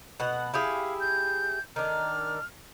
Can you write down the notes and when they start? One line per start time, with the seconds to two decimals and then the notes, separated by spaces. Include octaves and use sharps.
0.20 B2 F#5
0.54 E4 G4 G#4 F5
1.00 G6
1.76 D#3 D4 F6